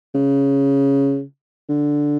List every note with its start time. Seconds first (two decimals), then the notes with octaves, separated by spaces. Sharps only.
0.15 C#3
1.69 D3